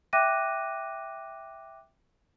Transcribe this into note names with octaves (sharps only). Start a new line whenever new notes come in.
E5 G5 D6 F#6 A#6 D#7